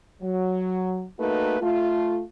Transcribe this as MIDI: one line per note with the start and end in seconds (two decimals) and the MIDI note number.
0.21 1.03 54
1.19 1.59 57
1.19 1.59 58
1.19 1.59 63
1.19 1.59 66
1.19 1.59 71
1.60 2.21 57
1.60 2.21 65